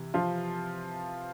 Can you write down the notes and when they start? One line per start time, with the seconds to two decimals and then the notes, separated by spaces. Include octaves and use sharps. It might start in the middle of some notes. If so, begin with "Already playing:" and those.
Already playing: C3 E3
0.14 F3 F4